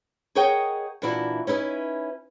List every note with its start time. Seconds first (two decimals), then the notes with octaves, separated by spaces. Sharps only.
0.35 G#4 A#4 C#5 D#5 F#5 G5
1.02 A#2 E3 D4 E4 F#4
1.47 C#4 D#4 E4 B4